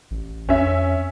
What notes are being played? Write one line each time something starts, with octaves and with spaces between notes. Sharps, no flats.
A1
F2 C#4 E5